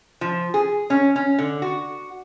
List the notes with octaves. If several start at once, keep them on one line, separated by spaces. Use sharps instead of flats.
F3
G#4
C#4
C#4
D3
F#4